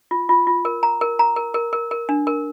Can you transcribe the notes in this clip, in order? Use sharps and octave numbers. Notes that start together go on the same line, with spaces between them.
F4
F4
F4
A#4
A#5
A#4
A#5
A#4
A#4
A#4
A#4
D4
A#4